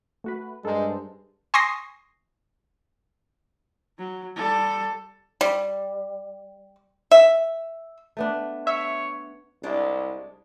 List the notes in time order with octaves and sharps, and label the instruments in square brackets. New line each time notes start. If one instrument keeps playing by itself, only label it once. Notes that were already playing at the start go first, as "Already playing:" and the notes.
[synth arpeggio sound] A3 F#4 B4
[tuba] G2 [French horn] G#3 [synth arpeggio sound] A4 A#4 C5
[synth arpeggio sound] G#5 C6 C#6 D#6 A#6 C7
[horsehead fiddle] F#3
G3 A4
[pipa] G3
E5
[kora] A3 B3 D4
[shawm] C#5 [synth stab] E5
[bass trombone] C2 [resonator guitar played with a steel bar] G#3 D4